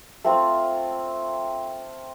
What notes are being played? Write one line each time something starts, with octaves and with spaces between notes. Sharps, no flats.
A3 C4 F4